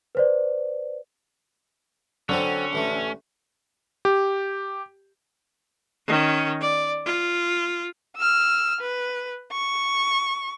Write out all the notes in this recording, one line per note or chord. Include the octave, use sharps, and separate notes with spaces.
B4 C5 D5
D3 F#3 C4 C#4 A4 F7
A1 E3 A3
G4
D#3 C#4
D5
F4
E6 F6
B4
C#6